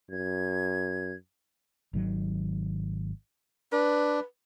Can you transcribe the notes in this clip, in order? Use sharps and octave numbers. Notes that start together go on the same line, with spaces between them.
F#2 G#6
G#1 D#3 F#3
D4 B4